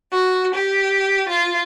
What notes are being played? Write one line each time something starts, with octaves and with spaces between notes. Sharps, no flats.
F#4
G4
F4